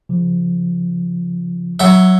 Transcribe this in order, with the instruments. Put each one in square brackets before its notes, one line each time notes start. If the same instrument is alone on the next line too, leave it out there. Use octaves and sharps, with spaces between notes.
[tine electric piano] C#3 F3
[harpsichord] F#3 E5